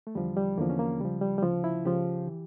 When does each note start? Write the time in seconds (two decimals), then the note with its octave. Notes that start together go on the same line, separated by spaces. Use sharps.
0.07 A3
0.15 E2 D3 F3 G3
0.37 G3
0.58 E2 D3 F3 A#3
0.70 C#4
0.79 A#3
1.00 C#2 C#3 F3 G3
1.21 G3
1.38 G3
1.42 D2 C#3 F3
1.64 E4
1.85 C#2 C#3 F3 G4
2.27 E3